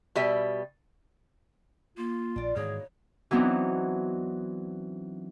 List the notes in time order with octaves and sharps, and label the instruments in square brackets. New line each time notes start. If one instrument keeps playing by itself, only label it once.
[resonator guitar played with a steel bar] B2 G3 E5
[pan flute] A#3 [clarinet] F4
[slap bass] A#1 [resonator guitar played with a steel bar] D4 D5
[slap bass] G#2 D#3 E3 [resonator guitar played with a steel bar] B2 A#3 D#4 [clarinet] G#4 [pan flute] C#5
[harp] E3 F#3 B3 C4 D4 D#4